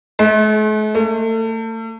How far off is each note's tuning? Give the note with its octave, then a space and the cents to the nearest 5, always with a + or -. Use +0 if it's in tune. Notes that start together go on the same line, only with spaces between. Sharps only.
A3 -45
A3 +35